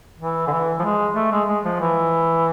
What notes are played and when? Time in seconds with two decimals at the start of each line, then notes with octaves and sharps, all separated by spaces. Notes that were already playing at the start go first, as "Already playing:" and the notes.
0.20 E3
0.47 D3
0.51 E3
0.80 F3
0.84 G#3
1.16 A3
1.32 G#3
1.48 G#3
1.64 F3
1.80 E3